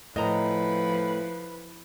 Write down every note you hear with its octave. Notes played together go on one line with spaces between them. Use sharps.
A2 F3 B4 D#5 A#5